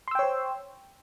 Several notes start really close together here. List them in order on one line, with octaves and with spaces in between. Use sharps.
C6 E6 G5 C#5 C5